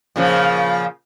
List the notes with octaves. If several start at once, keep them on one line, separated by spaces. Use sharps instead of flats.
A#2 C#3 F3